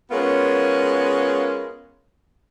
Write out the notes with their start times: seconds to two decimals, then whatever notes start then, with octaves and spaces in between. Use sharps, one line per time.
0.11 G#3 B3 C#4 F4 F#4 A#4